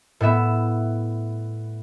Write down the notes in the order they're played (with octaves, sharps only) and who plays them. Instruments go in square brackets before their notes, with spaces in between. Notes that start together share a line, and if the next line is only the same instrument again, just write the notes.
[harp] A2 B3 E5 E7